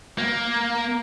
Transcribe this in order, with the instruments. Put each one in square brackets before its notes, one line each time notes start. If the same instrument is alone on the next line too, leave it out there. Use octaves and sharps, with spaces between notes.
[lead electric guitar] A#3